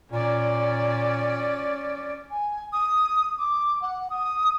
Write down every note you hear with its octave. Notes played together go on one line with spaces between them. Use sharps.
A#2 C#4 D5
G#5
D#6
D6
F#5
D#6